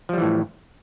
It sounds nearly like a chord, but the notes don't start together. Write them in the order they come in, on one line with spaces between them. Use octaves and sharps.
F3 G3 E3 A2